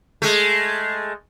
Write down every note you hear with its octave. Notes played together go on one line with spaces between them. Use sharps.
G#3 A3